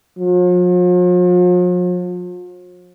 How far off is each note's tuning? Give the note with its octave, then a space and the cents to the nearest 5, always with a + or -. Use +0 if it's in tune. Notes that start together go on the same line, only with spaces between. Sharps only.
F3 +45